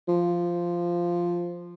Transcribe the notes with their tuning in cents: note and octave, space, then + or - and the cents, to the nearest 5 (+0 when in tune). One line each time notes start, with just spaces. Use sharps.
F3 -5